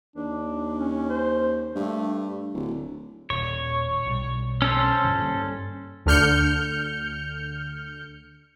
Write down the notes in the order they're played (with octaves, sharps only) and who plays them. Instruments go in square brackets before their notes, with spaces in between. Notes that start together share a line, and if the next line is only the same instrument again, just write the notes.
[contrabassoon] D#2 [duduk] D4
[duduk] C#4
C5
[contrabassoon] G2 [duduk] A3
[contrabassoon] D1 [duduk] D3
[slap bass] D#1 [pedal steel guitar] C#5
[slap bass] B1 G3
[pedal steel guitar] C#4 A4 C5
[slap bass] G2 D3
G2 G3 A#3
[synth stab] D2 D3 F6 G6 C#7